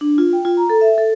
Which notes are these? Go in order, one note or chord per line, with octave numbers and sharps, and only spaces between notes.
D4
F4
G5
F4
A#5
A4
E5
A4